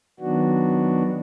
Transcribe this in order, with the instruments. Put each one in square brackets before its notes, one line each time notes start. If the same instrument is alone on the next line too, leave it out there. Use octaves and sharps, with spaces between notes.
[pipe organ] D#3 F#3 B3 D4 F#4